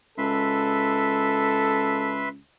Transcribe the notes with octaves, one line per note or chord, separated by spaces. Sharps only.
C#2 A4 B4 E5 C6